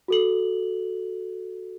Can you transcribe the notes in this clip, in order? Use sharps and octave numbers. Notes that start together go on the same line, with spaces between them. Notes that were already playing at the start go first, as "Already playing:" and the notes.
F#4 A4 F#7